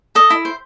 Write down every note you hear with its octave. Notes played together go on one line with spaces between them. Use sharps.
A4 D#5
E4
C5